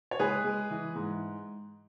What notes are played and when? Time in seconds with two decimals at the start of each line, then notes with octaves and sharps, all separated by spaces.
0.11 C#5
0.19 G#3 G#4 B4
0.44 G#3
0.70 E3
0.95 G#2